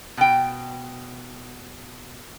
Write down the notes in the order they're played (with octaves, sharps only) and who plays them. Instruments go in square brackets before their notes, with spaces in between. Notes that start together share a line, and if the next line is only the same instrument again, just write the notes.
[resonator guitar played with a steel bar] B2 G5